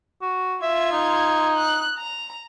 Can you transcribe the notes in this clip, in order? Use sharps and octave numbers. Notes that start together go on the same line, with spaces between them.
F#4
F4 E5 G#6
D#4
F#6
A#5